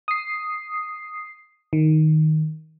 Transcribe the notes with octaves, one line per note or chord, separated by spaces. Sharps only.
D#6 C7
D#3